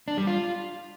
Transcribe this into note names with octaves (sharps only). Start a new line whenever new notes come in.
D4
G3
F4